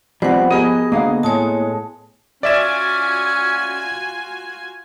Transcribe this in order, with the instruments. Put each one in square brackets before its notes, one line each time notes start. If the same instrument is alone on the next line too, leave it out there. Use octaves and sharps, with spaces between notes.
[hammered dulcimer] B2 [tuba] F3 [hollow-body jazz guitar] G3 B3 C4 [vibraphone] C5 F#5
[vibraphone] B3 G#4 [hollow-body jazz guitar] G4 A#4 [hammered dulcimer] D#5 G#5
[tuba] D2 [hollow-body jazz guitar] A#3 F5 F#5 [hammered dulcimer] D#5
[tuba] A2 [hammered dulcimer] G#3 [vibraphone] C#5 G#5 A5
[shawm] C#4 [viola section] F4 F#4 G#5 [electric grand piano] D5 E5 E7